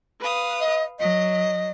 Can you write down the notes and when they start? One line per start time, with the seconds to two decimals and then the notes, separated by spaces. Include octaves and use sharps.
0.20 B4 F5 D#6
0.60 D#5
0.99 F#3 D#5